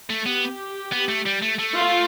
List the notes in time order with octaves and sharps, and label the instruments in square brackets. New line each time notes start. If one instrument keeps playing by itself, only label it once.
[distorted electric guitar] A3
[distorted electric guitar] B3 [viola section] G4
[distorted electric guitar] B3
A3
G3
A3
A3
[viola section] F4